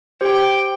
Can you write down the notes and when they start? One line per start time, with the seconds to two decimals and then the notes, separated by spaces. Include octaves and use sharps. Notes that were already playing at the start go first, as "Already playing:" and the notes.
0.21 G4 C5 G5